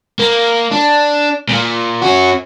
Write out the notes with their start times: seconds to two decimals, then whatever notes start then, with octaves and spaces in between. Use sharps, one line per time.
0.19 A#3
0.71 D4
1.49 A#2 A#3
2.02 C#4 F#4